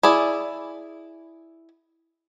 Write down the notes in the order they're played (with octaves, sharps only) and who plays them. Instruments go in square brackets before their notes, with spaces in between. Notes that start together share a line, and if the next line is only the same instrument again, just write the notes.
[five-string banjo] E4 G#4 D5